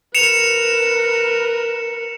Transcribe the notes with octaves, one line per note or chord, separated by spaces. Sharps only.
A#4 B4 C#7 E7 F7